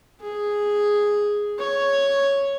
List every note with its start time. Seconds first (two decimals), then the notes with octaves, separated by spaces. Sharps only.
0.21 G#4
1.59 C#5